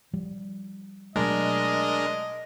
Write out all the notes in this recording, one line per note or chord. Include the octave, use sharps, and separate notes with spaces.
F3 G3
B2 F#3 G#3 A3 D4 A#4 D#5